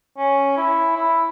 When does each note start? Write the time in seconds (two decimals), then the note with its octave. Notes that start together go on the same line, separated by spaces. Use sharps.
0.17 C#4
0.57 E4
0.96 E4